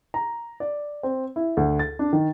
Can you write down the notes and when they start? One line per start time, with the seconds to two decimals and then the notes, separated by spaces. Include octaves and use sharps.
0.14 A#5
0.60 D5
1.03 C4
1.36 E4
1.57 D2
1.79 A6
1.99 D4
2.13 D#3